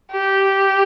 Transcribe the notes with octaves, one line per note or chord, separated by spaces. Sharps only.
G4